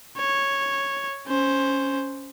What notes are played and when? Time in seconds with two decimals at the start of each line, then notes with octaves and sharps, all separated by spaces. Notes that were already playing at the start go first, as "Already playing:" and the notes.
0.17 C#5
1.27 C#4 C5